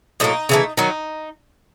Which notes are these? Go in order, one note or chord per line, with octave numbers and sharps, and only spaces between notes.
A2 F#3 A#3 D#4
C#3 E3 A3
D#3 F#3 D#4